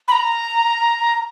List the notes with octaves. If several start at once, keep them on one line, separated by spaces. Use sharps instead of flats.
B5
A#5